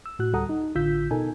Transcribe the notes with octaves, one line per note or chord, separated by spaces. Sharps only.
E6
A2 F#4 F#6
D2 G3 A4 F#5 A#5 D#6
D#4
A1 D3 F4 E6 G6 B6
B2 D#4 A4 A#4 G#5